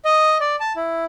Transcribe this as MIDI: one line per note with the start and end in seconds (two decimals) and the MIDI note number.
0.05 0.38 75
0.40 0.56 74
0.60 0.73 81
0.76 1.05 64